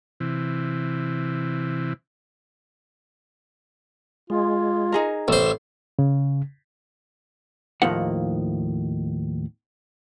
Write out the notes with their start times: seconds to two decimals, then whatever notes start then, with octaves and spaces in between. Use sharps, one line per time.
0.20 C3 E3
4.30 G#3 F4
4.92 D#4 G#4 A#4
5.28 A1 C5 E6
5.99 C#3
7.82 D#2 A2 F3 A#3 D#4 F#5